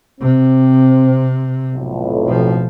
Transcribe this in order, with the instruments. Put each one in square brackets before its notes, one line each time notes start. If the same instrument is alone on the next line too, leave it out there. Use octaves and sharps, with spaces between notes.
[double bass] C3 [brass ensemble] C4
[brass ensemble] B1 F2 A2
[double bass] B2 F3